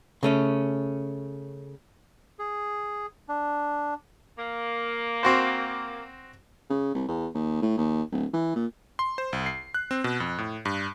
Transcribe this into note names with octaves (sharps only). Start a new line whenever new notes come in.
C#3 A3 C#4
G#4
D4
A#3
C4 F#4 C5
C#3
C2
E2
D#2
A2
D#2
D1
E3
A#2
C6
C5
C2
C7
F#6
C4
B2
F2
A2
G2